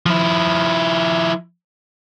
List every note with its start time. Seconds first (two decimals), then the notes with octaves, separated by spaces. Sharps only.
0.06 F3 E4